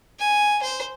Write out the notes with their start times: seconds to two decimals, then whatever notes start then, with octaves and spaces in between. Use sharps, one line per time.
0.19 G#5
0.62 C5